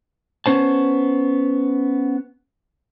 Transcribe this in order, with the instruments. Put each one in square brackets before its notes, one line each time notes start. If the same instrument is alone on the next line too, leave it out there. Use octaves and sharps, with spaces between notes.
[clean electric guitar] B3 C#4 C5 A5